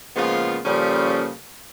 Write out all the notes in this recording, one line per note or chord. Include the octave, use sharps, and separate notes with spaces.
A#2 C#3 F3 G#3 B3 F4
A#2 C#3 F3 G3 C#4 A4